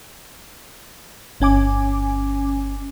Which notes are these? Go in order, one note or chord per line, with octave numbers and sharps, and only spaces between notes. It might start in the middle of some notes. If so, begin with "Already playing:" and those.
G1 C#4 G#5 D6